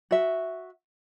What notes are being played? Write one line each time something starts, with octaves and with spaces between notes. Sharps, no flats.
F#4 E5